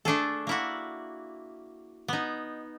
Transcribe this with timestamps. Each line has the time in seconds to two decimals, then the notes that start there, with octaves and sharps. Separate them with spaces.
0.05 A3 D4 G#4 A4
0.47 A#3 E4 F#4
2.08 B3 D#4